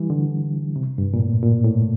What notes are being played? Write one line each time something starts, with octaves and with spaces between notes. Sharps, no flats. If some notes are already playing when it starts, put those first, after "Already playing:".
Already playing: E3 G3
D3
C3
G2
A#2
A2
A#2
A2